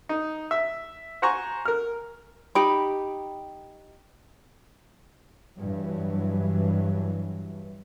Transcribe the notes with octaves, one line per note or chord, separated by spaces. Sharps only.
D#4
E5
C5 F#5 G#5 A#5 C#6
A#4 F6
D#4 G4 G5 B5
G2 E3 F#3